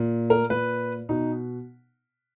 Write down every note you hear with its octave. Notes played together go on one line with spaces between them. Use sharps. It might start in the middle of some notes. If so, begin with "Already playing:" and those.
Already playing: A#2
A#4
A#2 B4
B2 D#4